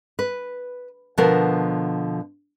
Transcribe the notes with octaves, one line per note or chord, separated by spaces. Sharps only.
B4
B2 D3 F3 B3 A#4